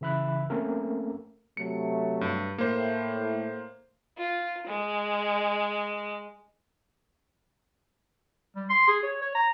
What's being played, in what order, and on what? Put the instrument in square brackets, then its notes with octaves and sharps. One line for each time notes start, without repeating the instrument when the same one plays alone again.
[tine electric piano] C#3 E3 E5 B5 F#6
A3 A#3 C4 C#4 A4 A#4
[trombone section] C3 F#3 A3 [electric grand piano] C#7
[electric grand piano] G2
[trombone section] A2 [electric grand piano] A#3 C5
[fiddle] F4
G#3
[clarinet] G3
C6
G#4
C#5
C#5
A#5